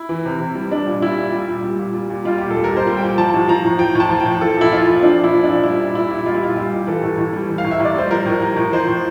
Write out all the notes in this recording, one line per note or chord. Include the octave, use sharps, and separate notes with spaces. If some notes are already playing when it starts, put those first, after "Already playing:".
Already playing: E4
E3
C3
C3
G3
G3 D4
A#2
G3 E4
A#2
G3
A#2
G3
A#2
G3
A#2
G3 F4
A#2 G4
A4
G3
A#4
A#2
C5
G3
G5
A#2
F3 A5
A2
F3 A#5
A2
F3 G5
A2 A5
F3
G5
A2
F3 A4
A#2 E4
F3 F4
A#2
F3 D4
A#2
E4
F3
A#2 D4
G3 E4
A#2
G3 E4
A#2
G3 F4
E4
A#2 F4
G3 G4
A#2
E3 A4
A2
A2
G3
E3
F5
A2
E5
A2 D5
G3 C5
F3 A#4
A2
F3 A#4
A2
F3 C5
A2